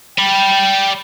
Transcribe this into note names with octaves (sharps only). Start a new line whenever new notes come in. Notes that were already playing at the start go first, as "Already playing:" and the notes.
D5 G5 B5